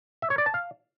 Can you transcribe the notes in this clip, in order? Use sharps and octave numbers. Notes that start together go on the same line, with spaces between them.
E5
C#5
D5
A5
F5